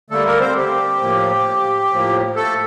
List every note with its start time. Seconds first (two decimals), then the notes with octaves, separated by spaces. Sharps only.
0.10 D3 G3 A3 A#3 A4
0.25 A#3 A#4
0.40 C4 C5
0.55 G4
1.01 A2 F3 A#3
1.90 A2 F3 A#3
2.36 A3 A4